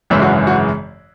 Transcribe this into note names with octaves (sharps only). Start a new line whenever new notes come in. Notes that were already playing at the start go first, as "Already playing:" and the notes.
G#1 F#2 C#3 E3 G#3 E5
F#4
F#4